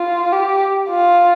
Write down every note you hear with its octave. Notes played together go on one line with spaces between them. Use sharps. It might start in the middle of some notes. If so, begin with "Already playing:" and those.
Already playing: F4
G4
F4